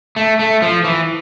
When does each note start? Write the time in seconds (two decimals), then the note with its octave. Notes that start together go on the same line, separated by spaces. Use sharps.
0.16 A3
0.39 A3
0.62 F3
0.84 E3